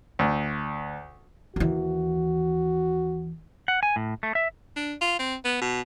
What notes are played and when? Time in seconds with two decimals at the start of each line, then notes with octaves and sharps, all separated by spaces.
0.19 D2
1.56 D#2 E3 F#4
3.68 F#5
3.83 G#5
3.96 A2
4.23 A3
4.35 E5
4.76 D4
5.01 F4
5.19 C4
5.45 B3
5.61 B2